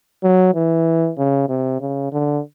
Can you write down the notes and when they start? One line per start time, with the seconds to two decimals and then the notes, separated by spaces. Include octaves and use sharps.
0.24 F#3
0.55 E3
1.18 C#3
1.50 C3
1.81 C#3
2.12 D3